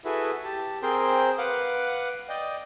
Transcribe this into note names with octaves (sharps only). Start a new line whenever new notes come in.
E4 F#4 G#4 A4 B4 E5
G4 A5
C4 G#4 A#4 C5 G5
B4 F5 F#5 D6
D5 D#5 G5